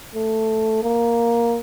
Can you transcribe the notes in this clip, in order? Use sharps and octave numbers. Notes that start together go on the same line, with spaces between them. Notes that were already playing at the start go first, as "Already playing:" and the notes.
A3
A#3